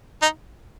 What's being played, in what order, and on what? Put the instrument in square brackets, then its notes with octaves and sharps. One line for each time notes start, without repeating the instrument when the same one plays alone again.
[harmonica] D#4